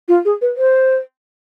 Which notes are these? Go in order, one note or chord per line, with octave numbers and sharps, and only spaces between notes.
F4
G#4
B4
C5